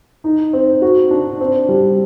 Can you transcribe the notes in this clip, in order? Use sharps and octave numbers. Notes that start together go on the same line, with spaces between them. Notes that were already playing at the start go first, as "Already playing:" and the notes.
D#4
C4
F#4
D4
C4
G3